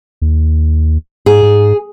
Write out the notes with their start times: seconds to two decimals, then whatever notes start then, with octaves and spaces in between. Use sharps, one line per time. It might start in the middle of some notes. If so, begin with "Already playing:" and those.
0.22 D#2
1.26 G#2 G#4
1.43 G#2